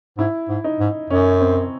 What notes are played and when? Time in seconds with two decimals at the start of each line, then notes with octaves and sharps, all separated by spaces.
0.18 G#2 E4
0.49 G#2
0.64 D#4
0.80 G#2
1.10 F#2 C#4
1.41 C4